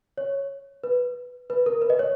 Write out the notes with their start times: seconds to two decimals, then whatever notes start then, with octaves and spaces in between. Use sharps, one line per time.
0.18 C#5
0.84 B4
1.50 B4
1.66 A#4
1.82 B4
1.90 D#5
1.99 C#5